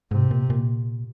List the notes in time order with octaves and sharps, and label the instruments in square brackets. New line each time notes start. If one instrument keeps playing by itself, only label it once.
[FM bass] G#2 [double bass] C3
[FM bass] A#2
A#2